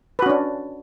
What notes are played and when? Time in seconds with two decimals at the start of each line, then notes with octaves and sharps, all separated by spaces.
0.19 B4
0.22 F#4
0.26 C#4
0.30 D4